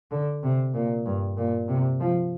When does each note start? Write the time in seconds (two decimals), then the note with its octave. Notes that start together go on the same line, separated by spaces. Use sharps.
0.11 D3
0.43 C3
0.74 A#2
1.06 G2
1.37 A#2
1.68 C3
2.00 F3